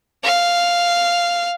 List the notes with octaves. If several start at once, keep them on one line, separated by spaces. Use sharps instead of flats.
F5